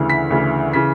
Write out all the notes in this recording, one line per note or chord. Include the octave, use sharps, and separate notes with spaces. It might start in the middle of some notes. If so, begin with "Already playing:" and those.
Already playing: D2 C#3 E3
B6
D2 C#3 E3
C#3 E3 B6